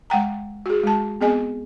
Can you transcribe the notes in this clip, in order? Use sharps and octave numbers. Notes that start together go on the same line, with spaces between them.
G#3 F#5 G5 A#5
F#4 G#4
G#3 A5
B3 C4 G#4 D#5 G#5